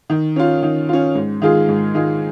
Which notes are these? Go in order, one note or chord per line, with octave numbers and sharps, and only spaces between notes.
D#3
C#4 F4
D#3
C#4 F4
G#2
D#3 G#3 F4 G#4
G#2
D#3 G#3 F4 G#4